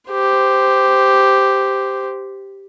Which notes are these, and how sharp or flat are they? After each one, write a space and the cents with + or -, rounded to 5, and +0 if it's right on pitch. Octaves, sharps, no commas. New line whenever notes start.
G4 +0 C5 -15